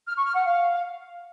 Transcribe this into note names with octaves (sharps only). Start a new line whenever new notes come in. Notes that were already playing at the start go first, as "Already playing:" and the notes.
F6
C#6
F6
F#5
F5